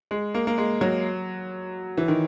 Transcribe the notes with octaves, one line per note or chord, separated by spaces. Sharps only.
G#3
A#3
A#3
G#3
F#3
E3
D#3